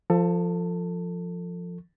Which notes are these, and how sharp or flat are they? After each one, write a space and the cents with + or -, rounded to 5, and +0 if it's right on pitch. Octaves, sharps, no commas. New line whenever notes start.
F3 -5 A4 +20